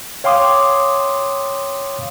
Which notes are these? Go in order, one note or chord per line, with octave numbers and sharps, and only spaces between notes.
C#5 F5 G5 C6 D6 D#6